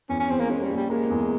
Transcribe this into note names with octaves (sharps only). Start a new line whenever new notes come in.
E2 C#4
C#4
E2 C4
A#3
G#3 C#4
G3
A#1
G3
G#3 A#3
E2